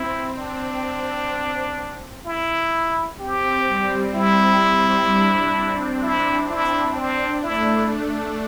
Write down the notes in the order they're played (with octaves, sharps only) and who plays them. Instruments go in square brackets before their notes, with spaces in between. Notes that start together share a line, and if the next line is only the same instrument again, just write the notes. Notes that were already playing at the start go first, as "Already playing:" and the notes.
Already playing: [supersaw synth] C4 [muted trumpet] E4
[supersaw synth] C4 [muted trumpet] D4
[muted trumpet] E4
[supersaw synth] C4 [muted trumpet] G4
[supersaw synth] G3
[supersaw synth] G3 [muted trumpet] E4
[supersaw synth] D4
C4
[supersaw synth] D4 [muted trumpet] E4
[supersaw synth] D4 [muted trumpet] E4
[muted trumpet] C4 [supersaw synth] D4
[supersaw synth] A3 [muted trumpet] E4
[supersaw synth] D4